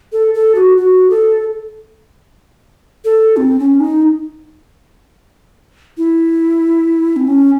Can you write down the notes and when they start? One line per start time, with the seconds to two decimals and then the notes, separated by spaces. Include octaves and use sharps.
0.13 A4
0.34 A4
0.55 F#4
0.77 F#4
1.10 A4
3.05 A4
3.37 C4
3.59 C#4
3.80 D#4
5.98 E4
7.16 C4
7.27 C#4